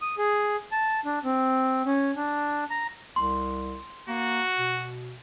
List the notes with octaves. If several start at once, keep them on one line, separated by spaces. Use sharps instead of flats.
D#6
G#4
A5
D4
C4
C#4
D4
A#5
C2 C6
A#3 F#4
B2